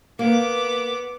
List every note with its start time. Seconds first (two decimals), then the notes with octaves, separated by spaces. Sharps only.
0.19 A#3 B3 D6